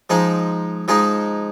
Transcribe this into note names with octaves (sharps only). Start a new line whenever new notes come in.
F3 G#3 D#4 G#4
F3 G#3 D#4 G#4